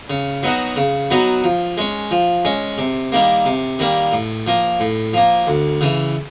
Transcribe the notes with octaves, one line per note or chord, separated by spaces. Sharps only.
C#3
F#3 B3 D#4 F#4
C#3
F#3 B3 D#4 F#4
F3
G#3 C#4
F3
G#3 C#4
C3
D#3 G3 A#3
C3
D#3 G3 A#3
A2
F3 A#3
A2
F3 A#3
D2
C#3 E3